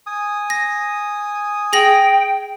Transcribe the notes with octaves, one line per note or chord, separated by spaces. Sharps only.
G#5 D#6
A#6
G#4 G5 A#6 F#7